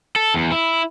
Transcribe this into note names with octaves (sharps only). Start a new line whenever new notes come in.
A4
E2
E4